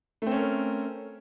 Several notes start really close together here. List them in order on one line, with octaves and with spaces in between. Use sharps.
A3 C4 C#4 A#4